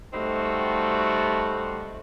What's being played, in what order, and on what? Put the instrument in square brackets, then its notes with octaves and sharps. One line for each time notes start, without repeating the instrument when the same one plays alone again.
[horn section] G3 A3 C4 D#4 F#4